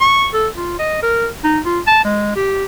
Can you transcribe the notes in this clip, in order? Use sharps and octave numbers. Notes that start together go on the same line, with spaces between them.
C#6
A4
F4
D#5
A#4
D#4
F4
A5
G#3
G4